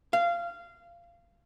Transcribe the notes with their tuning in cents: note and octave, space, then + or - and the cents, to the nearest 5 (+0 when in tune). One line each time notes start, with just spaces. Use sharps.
F5 -20